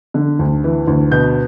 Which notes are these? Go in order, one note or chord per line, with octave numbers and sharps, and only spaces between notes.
D3
D2
E3
D2
B2 G6